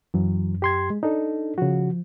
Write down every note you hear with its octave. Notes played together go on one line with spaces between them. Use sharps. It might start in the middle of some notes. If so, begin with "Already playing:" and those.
F#2 E3 F#3
G4 C6 G#6
G#3
D4 D#4 A4
C#3 F3 F#4